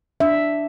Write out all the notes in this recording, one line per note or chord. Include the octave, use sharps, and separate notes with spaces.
D4 E5